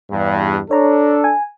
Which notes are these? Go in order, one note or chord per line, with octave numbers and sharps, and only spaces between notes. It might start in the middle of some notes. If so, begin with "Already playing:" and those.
E2 G2
D4 A4 C#5 A#5
G#5